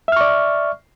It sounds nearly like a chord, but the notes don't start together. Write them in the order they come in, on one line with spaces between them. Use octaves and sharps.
E5 F6 C#6 D5